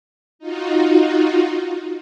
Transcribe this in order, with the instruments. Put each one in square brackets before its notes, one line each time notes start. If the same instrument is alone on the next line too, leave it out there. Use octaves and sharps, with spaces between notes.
[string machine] D#4 F4 F#4